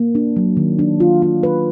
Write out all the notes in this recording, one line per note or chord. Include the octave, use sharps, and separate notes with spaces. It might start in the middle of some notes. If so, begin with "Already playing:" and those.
Already playing: A#3
D4
F#3
D#3
D4
F4
F4
B4